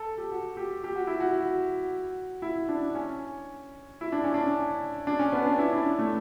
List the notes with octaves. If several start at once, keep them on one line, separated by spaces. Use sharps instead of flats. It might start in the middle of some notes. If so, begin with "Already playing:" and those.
Already playing: A4
G4
F#4
G4
G4
F#4
E4
F#4
E4
D4
C#4
E4
D4
C#4
D4
D4
C#4
B3
D4
E4
D4
C#4
A3